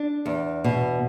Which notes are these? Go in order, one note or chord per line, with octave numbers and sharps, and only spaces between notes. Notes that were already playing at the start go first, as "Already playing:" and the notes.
Already playing: D4
E2
B2